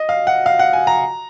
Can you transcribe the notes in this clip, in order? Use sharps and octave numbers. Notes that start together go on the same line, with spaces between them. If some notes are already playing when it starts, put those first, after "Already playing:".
Already playing: D#5
F5
F#5
F5
F#5
G#5
A#5